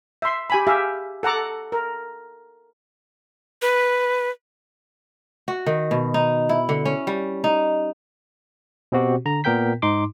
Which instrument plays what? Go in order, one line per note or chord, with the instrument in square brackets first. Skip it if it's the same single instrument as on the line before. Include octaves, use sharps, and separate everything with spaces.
[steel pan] E5 C6
G4 G#5 B5
G4 G#4 E5 F5
A4 F#5 A#5 D6
A#4
[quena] B4
[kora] F#4
D#3
B2
D#4
E4
D3
C#4
G3
D#4
[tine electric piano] B2 C4 F#4 G4
D3 A#5
A#2 B3 A#4 G5 G6 B6
G#2 D#4 C6 D6